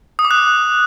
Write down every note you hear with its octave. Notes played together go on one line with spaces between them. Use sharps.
D#6
D6
F#6